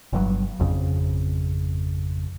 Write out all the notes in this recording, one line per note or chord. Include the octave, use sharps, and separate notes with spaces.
G1 G2 F#3
G#1 F2 C#3